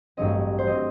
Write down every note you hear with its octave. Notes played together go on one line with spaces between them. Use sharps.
A1 G2 F#3 C4 D#5
C5
F#3 C4 D#5